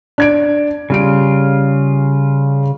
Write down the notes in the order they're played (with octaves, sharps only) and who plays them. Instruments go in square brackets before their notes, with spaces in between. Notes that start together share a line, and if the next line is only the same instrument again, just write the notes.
[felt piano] D4 G#6 D7
[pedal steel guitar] C#3 F4 [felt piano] G3 D7